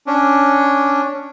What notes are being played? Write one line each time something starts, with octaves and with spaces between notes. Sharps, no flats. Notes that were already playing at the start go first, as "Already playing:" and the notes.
C#4 D4